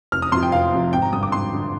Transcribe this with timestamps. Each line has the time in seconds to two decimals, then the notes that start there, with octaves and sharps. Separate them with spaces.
0.12 F1 F6
0.22 D#6
0.32 F2 C3 F3 C6
0.42 G5
0.52 F1 F5
0.72 F2 C3 F3
0.93 G#1 G5
1.02 A#5
1.12 G2 D3 D#6
1.23 D6
1.32 G#1 C6
1.53 D3